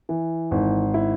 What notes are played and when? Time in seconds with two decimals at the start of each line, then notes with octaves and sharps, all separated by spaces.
0.09 E3
0.51 G#1
0.94 E4